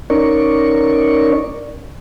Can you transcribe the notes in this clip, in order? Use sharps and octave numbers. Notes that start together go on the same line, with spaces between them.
C#4 D#4 A#4 D5 C#6